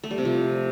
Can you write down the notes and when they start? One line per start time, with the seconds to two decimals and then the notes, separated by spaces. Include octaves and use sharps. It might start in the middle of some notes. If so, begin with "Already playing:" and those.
0.04 A3
0.11 G3
0.18 C3
0.25 F3